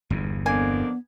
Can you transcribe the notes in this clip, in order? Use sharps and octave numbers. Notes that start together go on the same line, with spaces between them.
G1 E2
F2 A#3 B3 D4 G#5